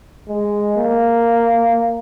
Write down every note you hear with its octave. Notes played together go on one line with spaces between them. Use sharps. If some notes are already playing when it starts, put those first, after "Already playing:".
G#3
A#3